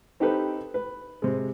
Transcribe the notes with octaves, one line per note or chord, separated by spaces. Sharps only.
C4 D#4 G4 A4 B4
B4
C3 G#3